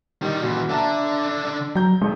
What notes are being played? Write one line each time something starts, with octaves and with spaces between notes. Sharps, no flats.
D#3 G3 D#4
A#2 E3 F#4
D3 D4 E5 A5 A#5
F#3 A#5 G6
G#1 F2 G#3